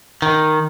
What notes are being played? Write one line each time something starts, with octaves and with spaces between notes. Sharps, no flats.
D#3